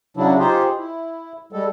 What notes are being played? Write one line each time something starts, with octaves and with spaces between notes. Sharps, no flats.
C#3 F#3 D4 E4
D#4 F4 G4 G#4 C5
E4
G3 G#3 A4